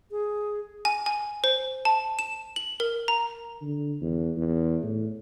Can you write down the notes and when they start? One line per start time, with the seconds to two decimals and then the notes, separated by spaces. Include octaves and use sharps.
0.11 G#4
0.85 G#5
1.06 G#5
1.44 C5
1.85 A5
2.19 E7
2.56 F#7
2.80 A#4
3.08 A#5
3.62 D3
4.01 E2
4.37 E2
4.84 A2